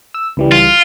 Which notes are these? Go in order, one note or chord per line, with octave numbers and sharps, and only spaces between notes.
E6
C#2 E3 G3
F4